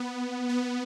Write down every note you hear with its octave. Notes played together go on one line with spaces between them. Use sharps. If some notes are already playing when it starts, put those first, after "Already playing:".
Already playing: B3
B3